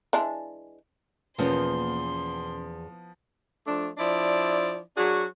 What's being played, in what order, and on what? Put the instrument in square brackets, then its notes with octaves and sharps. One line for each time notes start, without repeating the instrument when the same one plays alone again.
[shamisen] E3 G#3 D4
[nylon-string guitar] E2 [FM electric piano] B2 A#3 C#4 [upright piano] F3 B3 [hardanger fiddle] C6
[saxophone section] F3 A3 D4
F3 D4 E4 D5
F#3 D4 F#4 G#4